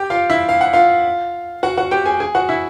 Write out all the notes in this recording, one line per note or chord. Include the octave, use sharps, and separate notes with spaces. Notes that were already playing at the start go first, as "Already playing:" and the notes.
Already playing: G4 G5
F4 F5
E4 E5
F5
F#5
F4 F5
F#4 F#5
F#4 F#5
G4 G5
G#4 G#5
G#4 G#5
F#4 F#5
E4 E5